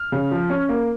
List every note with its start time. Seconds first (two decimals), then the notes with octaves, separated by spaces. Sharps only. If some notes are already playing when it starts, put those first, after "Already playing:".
Already playing: F6
0.12 C#3
0.31 F3
0.50 C#4
0.69 A#3